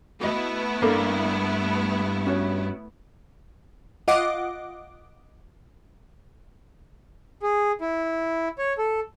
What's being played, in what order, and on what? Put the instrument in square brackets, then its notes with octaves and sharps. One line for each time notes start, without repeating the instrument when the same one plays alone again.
[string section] A3 B3 E4 [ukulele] F#4 D#5
[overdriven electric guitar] G2 [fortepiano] A#3 [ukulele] D4 A4 D5
[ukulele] C#4 F#4 C#5
[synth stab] F4 D#5 F#5 D6
[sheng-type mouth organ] G#4
E4
C#5
A4